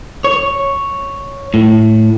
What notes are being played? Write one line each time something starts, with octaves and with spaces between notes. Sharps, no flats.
C#5
A2